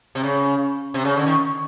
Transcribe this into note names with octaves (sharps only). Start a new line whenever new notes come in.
C3
C#3
C3
C#3
D3
D#3